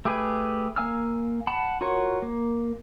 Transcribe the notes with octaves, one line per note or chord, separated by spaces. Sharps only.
A3 G4 G#4 B4 G#5
A#3 F5 G#5 E6 F6
F#5 A5 B5
F4 F#4 A#4 C#5 F#5
A#3